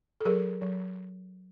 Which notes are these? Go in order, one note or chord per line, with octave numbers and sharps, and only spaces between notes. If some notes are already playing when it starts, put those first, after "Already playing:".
A4
F#3 G#4 A#4
F#3